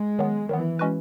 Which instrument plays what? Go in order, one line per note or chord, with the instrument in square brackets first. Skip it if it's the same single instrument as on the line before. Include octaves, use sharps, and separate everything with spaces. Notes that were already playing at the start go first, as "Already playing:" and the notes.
Already playing: [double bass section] G#3
[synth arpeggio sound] D#3 F#3 B3
[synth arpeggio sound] D#3 F#3 B3 [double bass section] E3
[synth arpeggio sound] G#3 C#4 F#4 B4